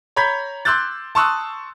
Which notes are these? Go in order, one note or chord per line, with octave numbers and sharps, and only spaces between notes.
C#5 A#5 B5 G6 G#6 B6
C6 D6 E6 F#6 G6 A6
A5 C6 C#6 D#6 E6 F#6